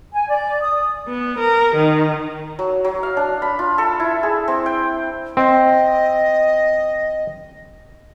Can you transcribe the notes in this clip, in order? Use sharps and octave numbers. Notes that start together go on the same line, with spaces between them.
G#5
D5
D#6
B3
A#4
D#3
F#3
F#3
F5
D4
B5
F4
A4
E4
G#4
C4
G5
C4 D#5